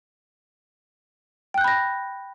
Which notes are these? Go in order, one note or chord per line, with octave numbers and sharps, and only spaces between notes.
G5 B5 F#6 G6 A#6